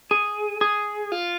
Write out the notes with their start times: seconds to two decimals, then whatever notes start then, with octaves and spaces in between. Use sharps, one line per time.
0.11 G#4
0.61 G#4
1.12 F4